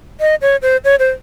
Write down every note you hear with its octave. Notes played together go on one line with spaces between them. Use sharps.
D#5
C#5
C5
C#5
C5